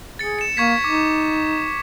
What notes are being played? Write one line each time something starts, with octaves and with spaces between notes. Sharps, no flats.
G#4 A6 C#7
C#7 E7
A#3 C#6 G#6 B6
D#4 D6